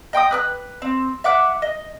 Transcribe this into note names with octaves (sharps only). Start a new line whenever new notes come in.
D#5 G5 C6 D#6
B4 D#6 F#6
C4
E5 F#5 D6 F#6
D#5